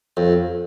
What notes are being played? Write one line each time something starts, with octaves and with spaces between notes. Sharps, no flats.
F2